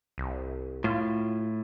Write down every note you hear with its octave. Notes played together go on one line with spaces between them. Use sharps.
C2
A2 F4